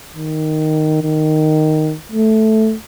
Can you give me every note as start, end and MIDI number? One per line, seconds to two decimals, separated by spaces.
0.15 0.99 51
1.02 1.94 51
2.12 2.75 57